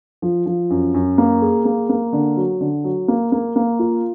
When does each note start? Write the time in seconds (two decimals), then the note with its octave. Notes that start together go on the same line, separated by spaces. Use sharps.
0.22 F3
0.46 F3
0.70 F#2
0.94 F#2
1.18 A#3
1.42 G#4
1.65 A#3
1.89 A#3
2.13 D3
2.37 F#3
2.61 D3
2.84 F#3
3.08 A#3
3.32 A#3
3.56 A#3
3.79 F4